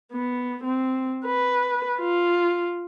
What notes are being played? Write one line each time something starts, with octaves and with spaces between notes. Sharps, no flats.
B3
C4
B4
F4